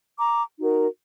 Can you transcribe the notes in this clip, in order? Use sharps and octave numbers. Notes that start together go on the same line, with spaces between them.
A#5 D6
D#4 F#4 A#4